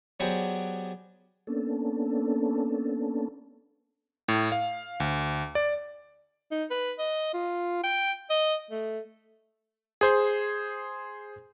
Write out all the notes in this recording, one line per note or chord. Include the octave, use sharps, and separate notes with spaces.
F#3 B3 G4 G#4 C5 D5
A#3 B3 C#4 D4 A4
A2
F5
D2
D5
D#4
B4
D#5
F4
G5
D#5
A3
G#4 C5 G#6